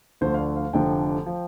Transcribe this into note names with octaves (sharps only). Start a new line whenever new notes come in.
D2 D3 F3 C5
F5
D5
F5
F1 F2 D3 F3 G5
F3